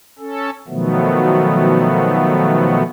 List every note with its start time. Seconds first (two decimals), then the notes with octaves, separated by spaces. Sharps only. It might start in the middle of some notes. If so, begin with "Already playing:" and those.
0.19 C#4 A4
0.68 B2 D#3 F3 F#3 A3 B3